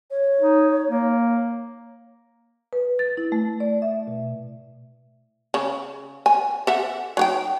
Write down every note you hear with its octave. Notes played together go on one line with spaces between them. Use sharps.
C#5
D#4
A#3
B4
A6
E4
A3
D5
E5
B2
C#3
G#5
A4 E5 F#5
F#3 D#4 G5